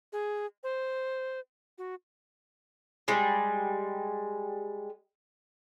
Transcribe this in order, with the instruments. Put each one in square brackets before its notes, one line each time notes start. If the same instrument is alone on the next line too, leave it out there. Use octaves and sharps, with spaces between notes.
[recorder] G#4
C5
F#4
[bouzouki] G3 G#3